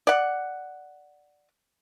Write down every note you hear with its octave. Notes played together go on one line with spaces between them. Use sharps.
D5 F#5